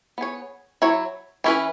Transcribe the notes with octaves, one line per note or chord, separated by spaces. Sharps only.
B3 G#4 C#5
F#3 E4 C#5
E3 C#4 E4 B4